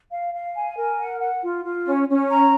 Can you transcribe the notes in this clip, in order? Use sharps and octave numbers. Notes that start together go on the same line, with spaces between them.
F5
F5
G#5
A#4
F#5
F#5
F4
F4
C#4
C#4
A#5